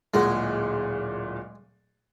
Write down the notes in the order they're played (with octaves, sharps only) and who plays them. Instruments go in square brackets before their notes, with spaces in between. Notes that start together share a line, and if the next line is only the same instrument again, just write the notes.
[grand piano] D1 A#2 F#5 [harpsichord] G#3